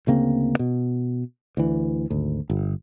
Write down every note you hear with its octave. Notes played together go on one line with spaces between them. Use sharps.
D2 C#3 A#3 C4
B2
D2 E3
G#1 D2
G1